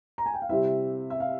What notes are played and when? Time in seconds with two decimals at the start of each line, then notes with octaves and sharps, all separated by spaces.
0.18 A#5
0.26 G#5
0.34 G5
0.42 F5
0.49 C3 G3 C4 E4 E5
1.10 E5
1.20 F5